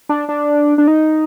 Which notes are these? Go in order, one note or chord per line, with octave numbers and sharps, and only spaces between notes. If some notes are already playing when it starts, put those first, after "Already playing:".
D4
D4
D4
D#4